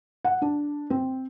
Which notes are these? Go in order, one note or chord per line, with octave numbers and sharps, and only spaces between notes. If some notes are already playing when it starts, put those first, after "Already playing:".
F#5
D4
C4